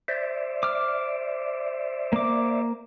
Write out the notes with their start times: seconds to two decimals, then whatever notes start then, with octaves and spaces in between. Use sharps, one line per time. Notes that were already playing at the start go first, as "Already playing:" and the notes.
0.08 C5 D5 E5
0.63 D6 F6
2.13 A#3 D6